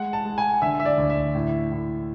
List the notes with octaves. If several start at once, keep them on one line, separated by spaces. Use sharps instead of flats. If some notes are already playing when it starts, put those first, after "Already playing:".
Already playing: G#3 F#5
A5
G#3
G#5
D3 E5
E5
D5
D2
E5
A2
A2